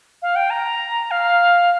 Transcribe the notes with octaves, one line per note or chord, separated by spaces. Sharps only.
F5
G5
A#5
F5